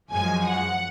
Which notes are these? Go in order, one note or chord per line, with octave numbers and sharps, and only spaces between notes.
F#2 F3 G#3 G#5
F#5